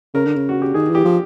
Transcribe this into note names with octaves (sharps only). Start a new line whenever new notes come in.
C#3 A#4
D3
C#3
F#4
G4
D#3 G#4
E3
G4
F3